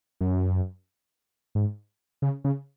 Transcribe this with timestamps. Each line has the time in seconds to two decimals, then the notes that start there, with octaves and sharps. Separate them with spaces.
0.21 F#2
1.55 G#2
2.22 C#3
2.44 C#3